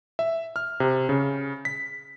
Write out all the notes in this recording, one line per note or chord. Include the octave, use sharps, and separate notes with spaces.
E5
F6
C3
C#3
B6